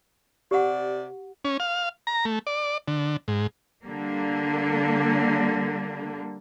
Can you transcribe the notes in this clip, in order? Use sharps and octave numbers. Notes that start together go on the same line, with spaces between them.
C3 G4 D5 F#5
C#4
F5
A#5
A3
D5
D3
G#2
D3 G3 A#3